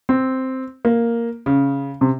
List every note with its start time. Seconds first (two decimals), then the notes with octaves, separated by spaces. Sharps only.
0.09 C4
0.85 A#3
1.46 C#3
2.01 C3